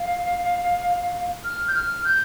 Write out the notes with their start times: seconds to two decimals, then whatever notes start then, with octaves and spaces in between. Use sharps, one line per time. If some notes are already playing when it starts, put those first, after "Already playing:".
Already playing: F5
1.44 F6
1.68 G6
1.75 F6
2.05 G6